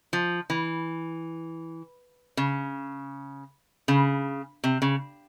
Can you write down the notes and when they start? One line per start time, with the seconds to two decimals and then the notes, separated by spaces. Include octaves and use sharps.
0.13 F3
0.50 E3
2.37 C#3
3.88 C#3
4.64 C3
4.82 C#3